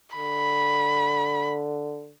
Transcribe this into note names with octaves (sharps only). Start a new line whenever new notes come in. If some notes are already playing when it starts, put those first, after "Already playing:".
D3 B5